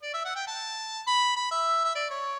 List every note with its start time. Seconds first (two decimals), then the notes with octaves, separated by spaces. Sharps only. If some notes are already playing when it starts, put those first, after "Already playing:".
0.03 D5
0.14 E5
0.25 F#5
0.36 G5
0.47 A5
1.07 B5
1.37 B5
1.51 E5
1.85 E5
1.95 D5
2.10 C#5